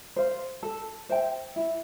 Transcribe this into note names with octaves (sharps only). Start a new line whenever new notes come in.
C5 F5
A4
C5 E5 G5
E4